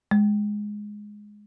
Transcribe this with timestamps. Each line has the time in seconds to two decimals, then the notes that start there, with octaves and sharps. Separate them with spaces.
0.11 G#3